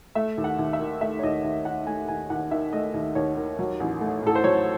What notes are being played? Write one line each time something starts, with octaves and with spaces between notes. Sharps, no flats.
A3 E5
D#2
F#5
D#2
E5
D#3
A3 E5
C#5
D#2 D#5
D#2
D#3 F#5
A3 G#5
D#2 G#5
D#2 F#5
D#3 E5
A3 D#5
D#2
D#2 C#5
D#3
F#3
A1
A3
A2 A4
C5
F#3 C#5